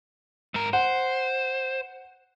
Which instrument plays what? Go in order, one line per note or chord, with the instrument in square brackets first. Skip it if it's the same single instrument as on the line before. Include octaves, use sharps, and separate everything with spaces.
[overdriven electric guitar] G#2 A#4
[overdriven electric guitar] C5 [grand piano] F#5